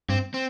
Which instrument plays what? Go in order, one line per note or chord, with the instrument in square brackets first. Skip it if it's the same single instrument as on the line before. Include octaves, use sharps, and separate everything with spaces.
[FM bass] G2 [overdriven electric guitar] C4
[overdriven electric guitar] C4